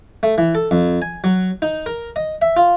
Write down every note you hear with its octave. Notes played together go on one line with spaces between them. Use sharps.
A3
E3
A4
F2
G#5
F#3
D#4
A#4
D#5
E5
F4